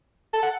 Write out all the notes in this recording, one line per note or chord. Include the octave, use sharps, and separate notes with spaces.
A4
F#5